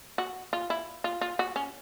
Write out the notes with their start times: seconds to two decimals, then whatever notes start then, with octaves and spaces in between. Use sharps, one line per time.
0.18 F#4
0.53 F4
0.70 E4
1.04 F4
1.21 F4
1.39 F#4
1.56 C#4